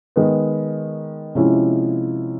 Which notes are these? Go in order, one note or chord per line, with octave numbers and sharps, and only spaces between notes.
D#3 G#3 B3
C3 F3 G#3 C#4 E4